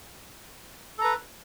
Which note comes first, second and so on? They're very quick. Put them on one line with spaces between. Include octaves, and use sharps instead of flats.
A4 A#5 B4